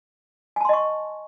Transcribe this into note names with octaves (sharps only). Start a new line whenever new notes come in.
D#5 G#5 A5 C6 C#6